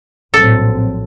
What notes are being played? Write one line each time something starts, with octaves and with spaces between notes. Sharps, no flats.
A#1 A2 F#3 C4 A4